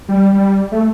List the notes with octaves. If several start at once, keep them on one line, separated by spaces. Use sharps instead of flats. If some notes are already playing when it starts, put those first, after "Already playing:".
G3
G3
A3